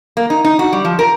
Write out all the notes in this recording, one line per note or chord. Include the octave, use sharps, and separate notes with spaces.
A#3
D#4
D#4
F#4
G3
F3
A#4